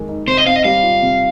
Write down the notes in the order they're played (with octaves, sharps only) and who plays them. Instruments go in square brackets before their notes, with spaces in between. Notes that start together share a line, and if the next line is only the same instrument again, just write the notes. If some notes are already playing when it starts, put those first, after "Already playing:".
Already playing: [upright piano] F2 D#3 G#3
D#4
[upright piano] C3 [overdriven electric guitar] C5
[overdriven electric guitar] D#5
[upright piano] C4 [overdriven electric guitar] F5
[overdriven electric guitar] D#5
[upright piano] G3 [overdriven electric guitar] F5
[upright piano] F4
C3